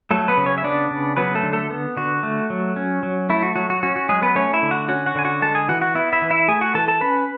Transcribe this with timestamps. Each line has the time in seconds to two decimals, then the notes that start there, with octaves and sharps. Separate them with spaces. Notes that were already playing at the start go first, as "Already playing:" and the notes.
0.11 F#3 A3 A4
0.28 B3 B4
0.37 C#3
0.46 C#4 C#5
0.58 E5
0.64 B3 D4 D5
0.91 C#3
1.17 F#3 B3 B4
1.35 A3 A4
1.43 D3
1.53 A3 A4
1.70 B3
1.97 D3 F#4
2.23 A3
2.50 F#3
2.76 C#4
3.03 F#3
3.30 A3 E4
3.43 F#4
3.56 F#3 F#4
3.70 F#4
3.83 C#4 F#4
3.96 F#4
4.09 F#3 G#3 G#4
4.22 B3 B4
4.35 A3 C#4 C#5
4.53 E4 E5
4.62 D3
4.71 F#4 F#5
4.88 C#4 F#4 F#5
5.06 F#4 F#5
5.15 D3 G#5
5.25 F#4 F#5
5.42 G#3 A4 A5
5.55 G#4 G#5
5.68 E3 F#4 F#5
5.81 F#4 F#5
5.95 B3 E4 E5
6.13 E4 E5
6.22 E3
6.30 E4 E5
6.48 A3 G#4 G#5
6.61 F#4 F#5
6.74 E3 A4 A5
6.88 A4 A5
7.01 C#4 B4 B5